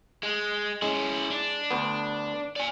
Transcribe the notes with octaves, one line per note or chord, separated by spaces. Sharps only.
G#3
G#3 C#4 E4
D4
D2 B3
D5 G#5